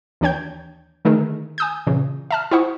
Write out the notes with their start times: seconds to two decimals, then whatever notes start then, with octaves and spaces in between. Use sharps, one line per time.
0.21 D#2 E3 D4 C#5 G5 G6
1.05 D3 D#3 A3 D#4 G#4 A#4
1.58 G#5 D#6 G6
1.87 A#2 C#3 E3
2.31 E5 A5 F6
2.51 E4 F4 C5 F#5 C#6 D#6